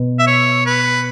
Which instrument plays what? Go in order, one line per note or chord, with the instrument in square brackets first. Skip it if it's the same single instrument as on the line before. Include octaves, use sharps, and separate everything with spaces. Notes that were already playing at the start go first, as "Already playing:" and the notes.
Already playing: [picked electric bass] B2 B3
[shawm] E5
C#5
B4